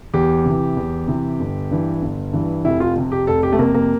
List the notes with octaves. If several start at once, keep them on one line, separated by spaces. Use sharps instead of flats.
E2 G4
C3 E3
E2
C3 E3
G1
G2 E3
G1
G2 E3
F1 E4
F4
F2 C3
G4
F1 A4
G4
A3
F2 C3 A#3
A#3